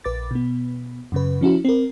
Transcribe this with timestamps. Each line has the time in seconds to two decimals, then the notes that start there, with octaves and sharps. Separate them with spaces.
0.04 A#1 B4 D6 A6
0.31 B2 B3
1.12 F#2 C#3 B4
1.41 F3 C#4 E4 F#4
1.65 C4 A#4